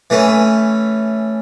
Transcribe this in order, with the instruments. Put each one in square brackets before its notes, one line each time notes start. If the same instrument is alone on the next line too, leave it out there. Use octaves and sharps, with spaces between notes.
[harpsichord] E3 A3 C#4